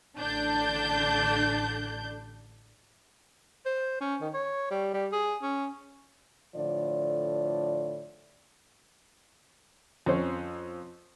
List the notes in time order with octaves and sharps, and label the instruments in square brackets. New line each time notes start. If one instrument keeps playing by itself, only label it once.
[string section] A1 D3 D4 G6
[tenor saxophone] C5
C#4
D#3
C#5
G3
G3
G#4
C#4
[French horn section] A2 D3 F3 D5
[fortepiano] F2 C#4 C5